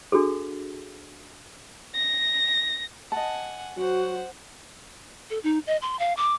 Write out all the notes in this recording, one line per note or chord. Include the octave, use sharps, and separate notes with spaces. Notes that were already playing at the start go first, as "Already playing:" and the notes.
D4 F#4 G#4 A4
A#6
D#5 F#5 G#5 A5
F#3 F#4 C5 F#5
A4
D#4
D#5
C6
F5
D6